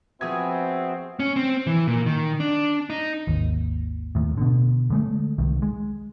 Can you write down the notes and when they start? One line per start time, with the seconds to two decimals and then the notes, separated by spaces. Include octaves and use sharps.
0.21 F3 B3 C4 F#4 G#4 E5 D#6 G#6
1.19 C#4
1.36 C4
1.67 E3
1.87 A#2
2.06 D#3
2.40 D4
2.90 D#4
3.27 G#1 D#2
4.15 D#2 A2
4.38 B2 D3
4.90 D3 G#3 A3
5.38 C2 D#3
5.62 G#3